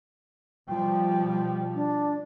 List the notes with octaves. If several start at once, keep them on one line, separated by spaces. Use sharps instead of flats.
B2 F3 G3 G5
D4